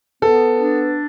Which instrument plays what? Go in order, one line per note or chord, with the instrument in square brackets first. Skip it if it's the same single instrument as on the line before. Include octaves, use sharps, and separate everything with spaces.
[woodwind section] B3 [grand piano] A4
[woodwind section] D4